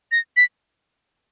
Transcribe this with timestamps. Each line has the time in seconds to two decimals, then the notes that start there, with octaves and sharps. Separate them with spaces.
0.12 A#6
0.37 B6